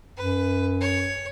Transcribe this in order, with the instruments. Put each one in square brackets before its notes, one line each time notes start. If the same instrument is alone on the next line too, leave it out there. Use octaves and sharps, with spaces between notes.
[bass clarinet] F#2 [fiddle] B4
[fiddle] C#5